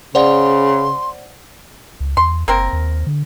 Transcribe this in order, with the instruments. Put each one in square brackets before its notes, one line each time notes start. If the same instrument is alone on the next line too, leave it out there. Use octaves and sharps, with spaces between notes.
[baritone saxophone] C#3 [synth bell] C5 D5 F#5 [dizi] C6
[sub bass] C#2
[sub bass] E2 [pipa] C6
[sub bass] F#1 [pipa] A#3 C4 A#4
[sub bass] D#2
D3